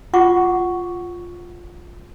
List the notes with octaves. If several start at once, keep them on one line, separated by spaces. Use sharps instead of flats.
F4 F#5 C#6 D6